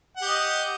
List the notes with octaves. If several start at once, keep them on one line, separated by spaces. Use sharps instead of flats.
G4 D#5 F#5